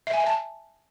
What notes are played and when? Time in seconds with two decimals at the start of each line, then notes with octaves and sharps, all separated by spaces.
0.07 E5
0.13 G#5
0.20 E5
0.26 A5